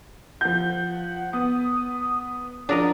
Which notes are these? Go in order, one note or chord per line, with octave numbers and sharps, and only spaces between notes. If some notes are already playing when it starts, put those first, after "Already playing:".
F3 F#5 G6
B3 D#6
F3 D4 A#4 D#5 F#5